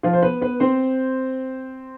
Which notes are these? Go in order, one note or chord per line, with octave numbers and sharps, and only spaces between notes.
F3 F4
C5
B3 B4
B3 B4
C4 C5